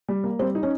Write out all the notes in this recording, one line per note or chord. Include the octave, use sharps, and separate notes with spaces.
G3
A#3
G3 C4
D#4
C#4